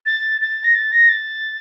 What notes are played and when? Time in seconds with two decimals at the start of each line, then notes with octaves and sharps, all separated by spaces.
0.06 A6
0.41 A6
0.64 A#6
0.75 A6
0.92 A#6
1.09 A6